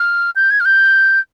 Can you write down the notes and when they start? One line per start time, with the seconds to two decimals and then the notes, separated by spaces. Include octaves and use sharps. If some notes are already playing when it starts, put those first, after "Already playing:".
Already playing: F6
0.36 G6
0.51 G#6
0.60 F6
0.65 G6